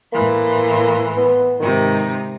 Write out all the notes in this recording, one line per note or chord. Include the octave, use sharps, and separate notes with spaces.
A2 E3 A#3 C6
B3
G#2 C3 D#3 D#4